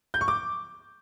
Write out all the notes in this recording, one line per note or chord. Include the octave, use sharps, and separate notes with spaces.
G6
C#6
D6